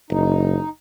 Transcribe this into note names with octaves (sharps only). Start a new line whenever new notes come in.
F#1 D#4